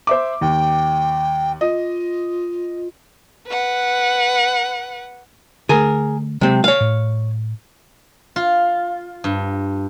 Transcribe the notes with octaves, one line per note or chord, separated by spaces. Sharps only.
C5 E5 D6
D#2 G5
F4 D#5
B4 F#5
D3 A3 G#4 A#4
C3 F#3 G#3 C4
C#5 F5
A2
F4
G2